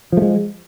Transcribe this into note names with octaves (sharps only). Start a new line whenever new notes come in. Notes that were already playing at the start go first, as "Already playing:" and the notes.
F3 G#3 A3